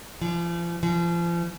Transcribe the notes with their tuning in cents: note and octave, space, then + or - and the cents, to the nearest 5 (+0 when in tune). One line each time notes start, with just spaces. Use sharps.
F3 -35
F3 -35